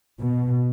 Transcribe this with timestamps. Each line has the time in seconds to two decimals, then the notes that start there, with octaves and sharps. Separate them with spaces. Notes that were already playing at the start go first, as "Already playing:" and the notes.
0.21 B2